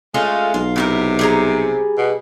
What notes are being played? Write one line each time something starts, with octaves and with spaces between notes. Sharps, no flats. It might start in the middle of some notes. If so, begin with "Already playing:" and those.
G#3 A3 C#4 F4
B1 F4
C3 E4 F4 A#4
G3 G#4 A#5
B2